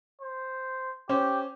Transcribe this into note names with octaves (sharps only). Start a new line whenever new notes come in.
C5
C#4 G4 C5